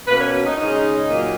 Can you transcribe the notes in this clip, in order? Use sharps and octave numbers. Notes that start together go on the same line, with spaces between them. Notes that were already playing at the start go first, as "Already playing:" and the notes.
B2 A#3 C#4 B4
C#5
F#4
D#4
C#3 G#3 C#4 D#4
A#2 F#3 A#3